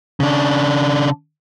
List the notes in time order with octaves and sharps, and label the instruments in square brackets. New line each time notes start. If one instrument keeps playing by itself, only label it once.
[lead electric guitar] C#3 D4